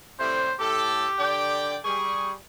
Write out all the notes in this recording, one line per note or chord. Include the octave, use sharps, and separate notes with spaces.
A2 C3 G3 C5
A2 G4 A4
D3 D5 G5
G3 G#4 C#6